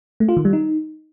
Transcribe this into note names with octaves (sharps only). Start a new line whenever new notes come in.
A3
F4
D#3
G3
D#4